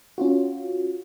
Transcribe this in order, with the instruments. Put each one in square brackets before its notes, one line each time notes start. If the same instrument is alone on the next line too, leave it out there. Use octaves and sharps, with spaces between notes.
[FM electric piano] C#4 F4 F#4